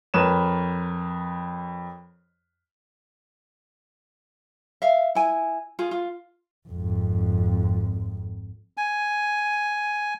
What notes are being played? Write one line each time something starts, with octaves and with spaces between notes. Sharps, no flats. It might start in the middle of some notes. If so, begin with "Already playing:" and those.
F2 A#4 B4 C#5 E7
E5 F5
E4 G#5
F4 G#4
F4
G#1 F2
G#5